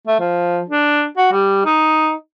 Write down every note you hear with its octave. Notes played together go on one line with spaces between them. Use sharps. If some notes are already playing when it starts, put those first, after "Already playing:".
A3
F3
D4
F#4
G3
D#4